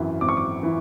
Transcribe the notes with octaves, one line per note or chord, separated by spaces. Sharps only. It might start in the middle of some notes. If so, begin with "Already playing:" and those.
Already playing: G#1 F#2 E3
G#1 D6
C#6
D6
E3